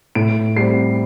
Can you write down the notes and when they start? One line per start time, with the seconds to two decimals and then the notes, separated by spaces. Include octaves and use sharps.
0.15 A2 D7
0.57 G3 C4 C7